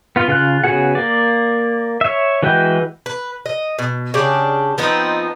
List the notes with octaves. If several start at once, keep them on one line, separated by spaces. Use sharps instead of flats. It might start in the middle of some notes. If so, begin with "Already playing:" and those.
B3 F4
C#3 F4 F#6
C#3 B3 F#4 G#4 F#5
A#3 D5
C#5 E5
E3 G#3 F#4 B4 G5
B4
D#5
B2
C#3 D4 G4
F3 B3 C4 D#4